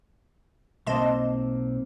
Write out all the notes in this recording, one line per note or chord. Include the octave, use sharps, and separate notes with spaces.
B1 A#3 C4 D#5 A5 C6